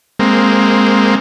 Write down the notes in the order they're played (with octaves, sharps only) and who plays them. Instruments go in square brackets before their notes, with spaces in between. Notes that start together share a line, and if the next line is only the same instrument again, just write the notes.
[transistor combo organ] G#3 A#3 C4